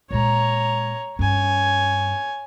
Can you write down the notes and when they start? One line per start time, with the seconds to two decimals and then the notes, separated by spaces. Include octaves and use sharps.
0.11 A#2 G#3 C#5 A#5
1.19 G2 C#4 C#5 G#5